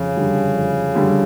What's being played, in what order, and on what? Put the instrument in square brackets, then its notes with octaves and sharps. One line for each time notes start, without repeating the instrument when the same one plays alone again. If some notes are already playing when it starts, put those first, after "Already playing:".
Already playing: [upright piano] F2 [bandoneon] C#3
[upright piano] D3 G3
F2
D3 G3